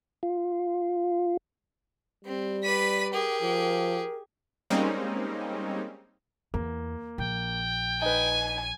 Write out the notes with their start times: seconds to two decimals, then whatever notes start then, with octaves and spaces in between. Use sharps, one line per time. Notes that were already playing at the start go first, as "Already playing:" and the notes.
0.23 F4
2.25 G3 C4
2.64 B4 D5 B6 D#7
3.14 G4 G#4 A#4
3.42 F3
4.70 G3 G#3 A#3 C4 C#4 D#4
6.54 E2 A#3
7.18 A#1 G5
8.02 D#4 B4 G#5